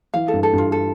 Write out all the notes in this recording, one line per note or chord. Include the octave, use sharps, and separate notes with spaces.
E3 F5
A4
G2
A4
G2 F4
A4